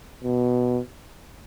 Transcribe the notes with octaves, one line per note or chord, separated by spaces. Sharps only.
B2